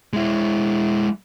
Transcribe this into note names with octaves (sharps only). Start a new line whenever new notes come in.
G#3 E4